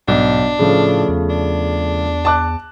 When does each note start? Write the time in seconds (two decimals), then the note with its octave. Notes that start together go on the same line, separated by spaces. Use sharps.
0.08 B1 G#2 D4
0.59 A2 C#3 F3 A3
1.09 E2
1.30 D4
2.25 A5 D6 F#6